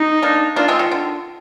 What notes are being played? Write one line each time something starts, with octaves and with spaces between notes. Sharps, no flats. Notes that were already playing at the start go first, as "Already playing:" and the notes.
Already playing: D#4
A#3 D4
A#3 D4 F4
G#3 C4
D#3
D3